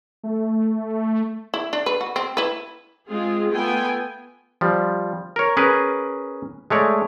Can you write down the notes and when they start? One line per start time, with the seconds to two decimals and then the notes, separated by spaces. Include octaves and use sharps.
0.24 A3
1.54 E4
1.73 D4
1.86 B4
2.01 F#4
2.16 C4
2.37 E4 B4
3.08 G#3 C4 F4 G#4
3.52 A3 B3 F4 G5 G#5
4.61 F3 G3
5.36 A#4 C#5
5.57 C#4 G#4 A#4 B4
6.70 G#3 A3 C#5 D5